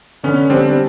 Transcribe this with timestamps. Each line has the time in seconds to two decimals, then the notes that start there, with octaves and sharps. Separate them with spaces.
0.23 D3 B3 C#4
0.50 G3 C4 D4